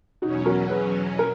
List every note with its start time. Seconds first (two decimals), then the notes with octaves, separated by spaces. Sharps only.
0.22 E2 B2 F#3 C#4 D#4 F#4
0.46 F#4 A#4
0.70 G#4 B4
1.19 A#4